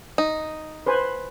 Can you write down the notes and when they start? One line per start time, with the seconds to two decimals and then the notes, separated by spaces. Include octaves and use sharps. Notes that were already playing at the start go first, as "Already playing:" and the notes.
0.18 D#4
0.86 B4 C5 G#5